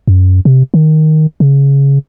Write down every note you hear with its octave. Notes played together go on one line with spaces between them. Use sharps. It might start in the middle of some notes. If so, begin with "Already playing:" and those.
F#2
C3
D#3
C#3